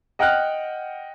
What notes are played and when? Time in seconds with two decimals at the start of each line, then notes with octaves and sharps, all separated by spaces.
0.19 D#5 F#5 G5 F6 F#6